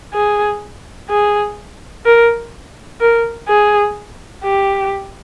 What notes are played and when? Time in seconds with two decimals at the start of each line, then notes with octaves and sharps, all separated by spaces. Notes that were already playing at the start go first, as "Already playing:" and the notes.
0.14 G#4
1.09 G#4
2.05 A#4
3.01 A#4
3.48 G#4
4.44 G4